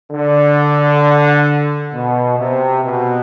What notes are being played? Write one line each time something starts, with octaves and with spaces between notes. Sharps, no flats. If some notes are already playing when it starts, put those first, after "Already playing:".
D3
B2
C3
B2